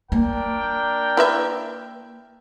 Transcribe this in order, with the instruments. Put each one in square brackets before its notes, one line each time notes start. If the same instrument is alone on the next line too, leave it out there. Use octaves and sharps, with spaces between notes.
[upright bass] A#3 [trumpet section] D4 A#4 G5
[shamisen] E4 B4 E5